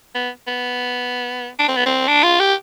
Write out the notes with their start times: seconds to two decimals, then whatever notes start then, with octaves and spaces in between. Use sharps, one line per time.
0.15 B3
0.47 B3
1.59 D4
1.68 C4
1.77 B3
1.86 C4
2.08 D4
2.24 F4
2.40 G4